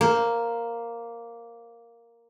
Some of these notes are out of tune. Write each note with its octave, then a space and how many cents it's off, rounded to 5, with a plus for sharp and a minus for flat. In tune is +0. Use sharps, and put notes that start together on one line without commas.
A#3 +0 C5 +10